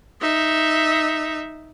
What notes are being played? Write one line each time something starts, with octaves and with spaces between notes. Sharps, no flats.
D#4 E5